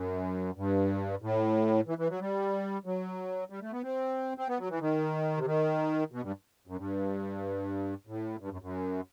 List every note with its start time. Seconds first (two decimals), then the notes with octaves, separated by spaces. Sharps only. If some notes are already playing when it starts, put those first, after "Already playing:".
Already playing: F#2
0.57 G2
1.22 A2
1.88 E3
1.98 E3
2.10 F#3
2.20 G3
2.86 F#3
3.50 G3
3.62 A3
3.72 B3
3.83 C4
4.38 C4
4.48 B3
4.59 F#3
4.69 E3
4.80 D#3
5.37 C3
5.46 D#3
6.12 B2
6.22 G2
6.67 F#2
6.77 G2
8.07 A2
8.40 G2
8.51 F#2
8.62 F#2